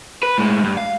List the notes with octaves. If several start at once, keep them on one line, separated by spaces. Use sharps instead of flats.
B4
A2 G#3
G2
F5